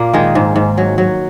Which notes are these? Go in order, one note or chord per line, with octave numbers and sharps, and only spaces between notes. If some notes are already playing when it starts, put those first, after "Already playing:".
Already playing: A#2 A#3
D#3 G#3
G#2
G#2
F#3
F#3